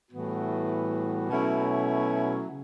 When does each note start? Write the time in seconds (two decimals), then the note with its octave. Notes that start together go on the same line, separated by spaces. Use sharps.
0.11 A2 E3 G3 B3 F#4
1.29 B2 F#3 A3 C#4 E4
2.48 C#3